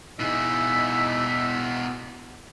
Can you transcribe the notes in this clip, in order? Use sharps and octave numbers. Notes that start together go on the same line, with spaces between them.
B2 D#4 E4 G#4 E5